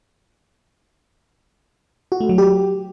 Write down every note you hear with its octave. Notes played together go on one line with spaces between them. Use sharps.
F#4
A3
F#3
G4